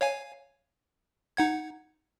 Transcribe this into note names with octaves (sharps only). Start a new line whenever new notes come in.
C#5 F5 G#5
D#4 F#5 G#6